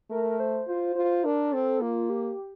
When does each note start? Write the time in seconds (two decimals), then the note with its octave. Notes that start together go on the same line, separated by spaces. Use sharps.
0.10 A3 A#4
0.30 A#4
0.40 C5
0.68 F4 C5
0.96 F4 C5
1.24 D4 A#4
1.53 C4 A4
1.81 A#3 F4
2.10 G4